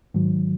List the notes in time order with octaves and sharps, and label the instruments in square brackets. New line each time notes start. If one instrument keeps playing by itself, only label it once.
[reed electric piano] G#2 D#3 F#3